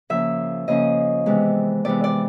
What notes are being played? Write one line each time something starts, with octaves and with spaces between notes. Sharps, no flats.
C#3 F3 A#3 C#4 E5
C#3 F3 A#3 C#4 D#5
C3 E3 G#3 B3
C3 E3 G#3 B3 D5
D5